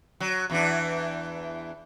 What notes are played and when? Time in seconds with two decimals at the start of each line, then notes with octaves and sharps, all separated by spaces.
0.20 F#3
0.50 E2 E3 D4